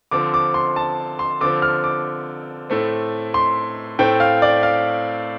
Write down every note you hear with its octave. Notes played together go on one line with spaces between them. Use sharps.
D3 F3 C4 D6
D6
C6
A5
C6
D3 F3 C4 D6
F6
D6
A2 A3 C4
C6
A2 A3 C4 G5
F5
D5
F5